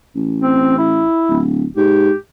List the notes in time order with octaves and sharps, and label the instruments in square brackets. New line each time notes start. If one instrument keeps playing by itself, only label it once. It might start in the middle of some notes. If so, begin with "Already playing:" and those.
[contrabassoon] A1
[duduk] C4
E4
[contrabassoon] D1
[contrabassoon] G#2 [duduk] G4